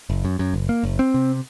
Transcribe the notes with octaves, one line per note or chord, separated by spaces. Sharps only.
F#1
F#2
F#2
F#1
A#3
F#1
C4
C3